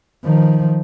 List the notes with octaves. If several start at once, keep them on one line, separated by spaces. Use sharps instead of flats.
D#3 F3